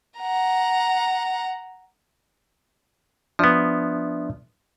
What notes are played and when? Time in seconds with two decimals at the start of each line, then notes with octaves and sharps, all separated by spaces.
0.20 F#5 A#5
3.39 F3 B3 D4 D5 E5